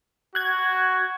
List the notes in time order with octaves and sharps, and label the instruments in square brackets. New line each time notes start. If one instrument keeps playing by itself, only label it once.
[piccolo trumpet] F#4 [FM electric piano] F#6 G#6